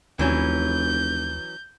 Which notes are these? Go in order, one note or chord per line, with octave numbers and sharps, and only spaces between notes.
F1 D#2 E3 F#3 C#4 G6